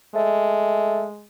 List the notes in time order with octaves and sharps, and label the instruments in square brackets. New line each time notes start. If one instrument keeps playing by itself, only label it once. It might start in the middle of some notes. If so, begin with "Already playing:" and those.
[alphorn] G#3 [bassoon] A3